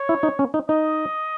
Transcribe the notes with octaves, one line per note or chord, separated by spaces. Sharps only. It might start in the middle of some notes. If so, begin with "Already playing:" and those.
Already playing: C#5
E4
D#4
C#4
D#4
D#4 D#5